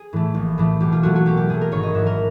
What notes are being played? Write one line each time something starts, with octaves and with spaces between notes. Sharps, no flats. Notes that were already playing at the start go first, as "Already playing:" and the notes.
Already playing: G#4
A2 E3 A3
A#1
A2 E3 A3
B1 G4
F4
A#2 F#3 A3 F#4
F#4
B1 G4
G4
A#2 F#3 A3 G#4
A#4
G#1 C#5
D#5
G#2 E3 E5
A#4